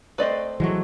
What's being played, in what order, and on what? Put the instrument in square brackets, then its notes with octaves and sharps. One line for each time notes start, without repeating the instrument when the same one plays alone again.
[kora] A3 C4 C5 [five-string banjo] B4 D5 D#5
[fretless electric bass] E3 F#3 [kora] G#3 A3